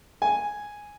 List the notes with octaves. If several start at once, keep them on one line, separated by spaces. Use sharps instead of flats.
G#5